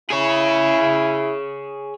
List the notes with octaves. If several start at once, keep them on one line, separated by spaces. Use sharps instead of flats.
E4 G#4 C#5